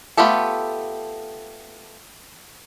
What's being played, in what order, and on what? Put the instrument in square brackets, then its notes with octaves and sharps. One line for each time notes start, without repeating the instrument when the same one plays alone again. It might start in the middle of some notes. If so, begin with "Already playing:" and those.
[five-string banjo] A3 B3 F4 G4 A4